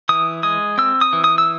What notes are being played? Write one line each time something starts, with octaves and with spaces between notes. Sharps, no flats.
E3 D#6
G#3 D#6
C4 E6
D#6
E3
D#6
E6